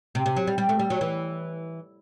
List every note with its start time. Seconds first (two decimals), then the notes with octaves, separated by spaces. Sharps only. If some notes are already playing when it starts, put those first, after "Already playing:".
0.15 C3
0.26 C3
0.36 F#3
0.47 G3
0.58 G3
0.69 A3
0.79 G3
0.90 F#3
1.01 E3